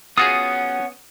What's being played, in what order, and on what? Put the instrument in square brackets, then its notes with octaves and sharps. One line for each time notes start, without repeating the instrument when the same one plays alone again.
[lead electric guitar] B3 C#4 [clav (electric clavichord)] F4 F#4 G#4 [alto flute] F#5 [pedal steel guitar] D#6